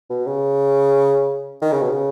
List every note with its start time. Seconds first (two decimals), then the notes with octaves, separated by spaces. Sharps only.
0.10 B2
0.27 C#3
1.62 D#3
1.72 C#3
1.82 B2
1.92 C#3